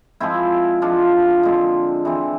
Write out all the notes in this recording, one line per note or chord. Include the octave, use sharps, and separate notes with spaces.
F3 G#3 C4 E4
F3 G#3 D4 F4
D3 G#3 C4
E3 G#3 C4